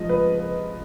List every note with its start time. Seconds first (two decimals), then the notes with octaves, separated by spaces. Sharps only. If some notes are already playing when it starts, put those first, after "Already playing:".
Already playing: F3 G#3 D#5
0.09 B4
0.40 B4